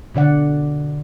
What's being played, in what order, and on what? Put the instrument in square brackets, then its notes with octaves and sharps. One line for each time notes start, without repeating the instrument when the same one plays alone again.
[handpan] B2 D3 D5 F#5